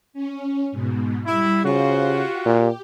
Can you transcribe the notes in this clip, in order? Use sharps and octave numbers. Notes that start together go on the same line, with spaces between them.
C#4
G#2 B2
G3 E4
C#3 F4 F#4 C5
G4
A#2